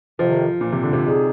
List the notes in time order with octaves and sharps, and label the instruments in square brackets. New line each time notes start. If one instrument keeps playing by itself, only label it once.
[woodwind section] F2 C3 D#3 [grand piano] F3
[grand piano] A#2
C3
D3
C3
[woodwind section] D3 G#3 D#4 G#4